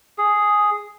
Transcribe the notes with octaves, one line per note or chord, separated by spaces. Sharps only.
G#4